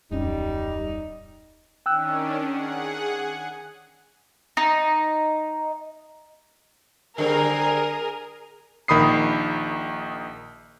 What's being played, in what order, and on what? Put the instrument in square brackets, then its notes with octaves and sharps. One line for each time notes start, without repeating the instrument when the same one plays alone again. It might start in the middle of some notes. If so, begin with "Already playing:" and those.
[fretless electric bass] D1 F2 C#4 [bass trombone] G3 [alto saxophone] D#4
[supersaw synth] D#3 C#4 D4 [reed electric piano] G5 E6 F#6
[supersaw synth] G#4 F#5
[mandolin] D#4
[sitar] D3 G3 C4 [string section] G#4 A#4
[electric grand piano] A#1 D#3 B5 D#6 C7